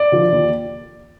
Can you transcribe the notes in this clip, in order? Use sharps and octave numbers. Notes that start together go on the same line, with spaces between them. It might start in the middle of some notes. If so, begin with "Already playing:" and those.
Already playing: D5
D3 F3
D#2